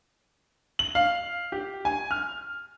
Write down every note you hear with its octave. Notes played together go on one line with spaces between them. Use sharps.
F#7
F5
G4
G#5
F6